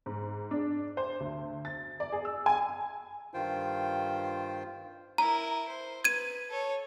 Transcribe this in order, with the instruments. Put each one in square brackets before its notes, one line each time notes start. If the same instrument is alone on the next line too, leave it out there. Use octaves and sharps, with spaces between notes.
[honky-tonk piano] G#2
D4
C5
D2
A6
D5
G#4
E6
G#5
[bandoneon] G2 D#3 F4 C5 G5
[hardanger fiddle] E4 A#4 [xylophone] A#5
[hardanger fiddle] C5
[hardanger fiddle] B4 [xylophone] G#6 D#7
[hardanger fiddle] A4 C#5